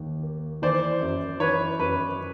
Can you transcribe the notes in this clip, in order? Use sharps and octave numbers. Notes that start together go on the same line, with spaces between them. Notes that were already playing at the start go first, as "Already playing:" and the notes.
Already playing: D#2
A#3
E3 C5 D5
F#2
E3 B4 C#5
F#2 B4